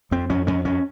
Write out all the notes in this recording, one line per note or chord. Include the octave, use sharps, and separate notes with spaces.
F2 C4
F2 C#4
F2 C#4
F2 C#4